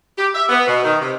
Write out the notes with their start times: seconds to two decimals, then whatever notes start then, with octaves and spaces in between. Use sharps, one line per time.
0.18 G4
0.35 E5
0.49 B3
0.67 B2
0.84 D#3
1.01 C3